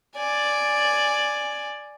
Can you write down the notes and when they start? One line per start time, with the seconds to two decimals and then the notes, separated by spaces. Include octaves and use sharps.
0.17 D5 G#5